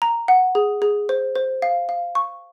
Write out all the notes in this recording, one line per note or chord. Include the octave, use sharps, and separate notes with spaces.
A#5
F#5
G#4
G#4
C5
C5
F5
F5
C#6